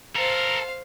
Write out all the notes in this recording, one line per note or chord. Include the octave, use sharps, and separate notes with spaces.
A4 A#4 C5 F5